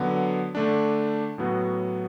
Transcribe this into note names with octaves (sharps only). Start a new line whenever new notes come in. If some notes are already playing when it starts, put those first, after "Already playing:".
Already playing: D3 F#3 B3
D3 A3 D4
A2 F#3 B3 F#4